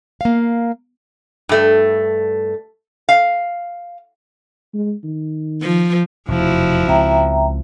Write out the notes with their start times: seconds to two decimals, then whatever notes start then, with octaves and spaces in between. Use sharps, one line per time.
0.21 A#3 F5
1.49 G2 A3
3.09 F5
4.74 G#3
5.04 D#3
5.62 F3
6.28 F1 E2 B2 F3 E4 F#4
6.88 C#2 C4 E5 G5 A#5